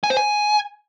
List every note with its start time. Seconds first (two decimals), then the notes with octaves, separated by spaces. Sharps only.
0.04 G#5
0.10 C5
0.17 G#5